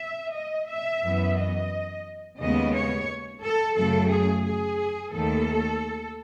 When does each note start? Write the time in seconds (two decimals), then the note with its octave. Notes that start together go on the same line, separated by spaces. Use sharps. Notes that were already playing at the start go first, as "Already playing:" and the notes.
Already playing: E5
0.34 D#5
0.69 E5
1.03 F#2 E3 B3
1.37 D#5
2.39 D#2 C#3 G#3 B3 D#5
2.74 C#5
3.42 A4
3.76 F#2 C#3 F#3 A3 A4
4.11 G#4
4.45 G#4
5.13 D#2 D#3 A3 A4